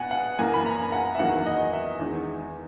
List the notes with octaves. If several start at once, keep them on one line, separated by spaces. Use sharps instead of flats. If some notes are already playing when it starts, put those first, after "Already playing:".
Already playing: B2 F#5 G#5
F#5
F#2 E3 A#3 G#5
B5
A#5
F#5
E5
E2 D#3 F#3 A#3 F#5
D#5
E5
E2 D#3 G#3